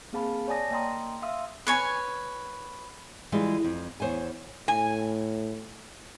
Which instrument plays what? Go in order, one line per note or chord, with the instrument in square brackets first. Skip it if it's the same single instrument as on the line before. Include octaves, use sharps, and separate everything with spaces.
[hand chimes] A#3 C4 G#4 F5 A5 B5
C#5 D5 G#5 A5 D#6 A#6
A#3 D#5 G5 A#5 C6 D#6
E5 F5 C6 D#6 E6
[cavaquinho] B4 C#5 G#5
[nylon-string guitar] E3 G3 G#3 F4
F2
E2 C5 C#5 G#5
[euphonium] A2 [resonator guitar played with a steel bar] G#5